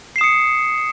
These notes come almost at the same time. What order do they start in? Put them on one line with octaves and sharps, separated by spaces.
C7 E7 D#6 C#7